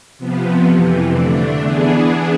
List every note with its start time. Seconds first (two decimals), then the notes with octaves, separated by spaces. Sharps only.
0.18 C3 F3 B3
0.65 F2 C3 E3
1.13 D3 A3 D4
1.61 E3 B3 D4 G#4